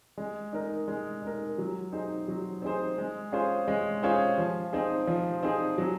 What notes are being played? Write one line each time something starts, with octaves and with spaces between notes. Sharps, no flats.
G#3
D#4 A#4
G#3
D#4 A#4
F#3
C4 D#4 G#4 C5
F#3
C4 D#4 G#4 C5
G#3
C#4 F4 G#4 C5
G#3
C#4 F4 G#4 C5
F3
C4 D#4 G#4
F3
C4 D#4 G#4
F#3